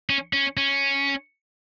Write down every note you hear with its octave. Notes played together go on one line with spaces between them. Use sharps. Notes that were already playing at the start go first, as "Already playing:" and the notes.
C#4
C#4
C#4